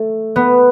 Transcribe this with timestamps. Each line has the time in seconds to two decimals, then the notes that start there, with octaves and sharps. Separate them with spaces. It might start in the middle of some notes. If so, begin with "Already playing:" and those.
Already playing: A3
0.36 B3